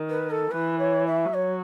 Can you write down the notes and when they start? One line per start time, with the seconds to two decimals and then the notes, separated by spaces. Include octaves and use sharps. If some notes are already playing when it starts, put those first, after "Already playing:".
Already playing: D#3
0.09 B4
0.30 A4
0.51 E3 B4
0.79 C#5
1.06 E5
1.33 F#3 C#5